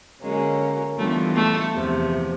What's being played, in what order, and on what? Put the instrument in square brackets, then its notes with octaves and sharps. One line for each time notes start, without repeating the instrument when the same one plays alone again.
[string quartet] D3 F#3 A#3 C#4 [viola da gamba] G#3
[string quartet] E3 G3 B3 D4 F4 [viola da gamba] A3
[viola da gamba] A3
[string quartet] E2 C3 F3